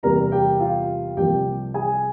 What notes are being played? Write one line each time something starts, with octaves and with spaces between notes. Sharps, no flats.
E2 C3 G3 A#3 A#4 A#5
G4 G5
F4 F5
C2 C3 F3 A#3 G4 G5
G#4 G#5